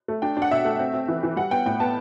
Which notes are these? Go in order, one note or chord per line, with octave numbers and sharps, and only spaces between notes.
A3
D4 G5
D4
F#5
B2 E5
A3
C4
C4
E3
E3
G3 F#5
B3 G5
A2 G5
B3 A5